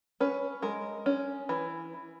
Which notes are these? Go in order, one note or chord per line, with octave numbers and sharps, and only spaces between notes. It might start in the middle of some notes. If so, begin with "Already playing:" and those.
C#4 B4
G#3 A#4
C#4
E3